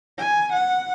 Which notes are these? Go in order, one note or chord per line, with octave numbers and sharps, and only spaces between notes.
G#5
F#5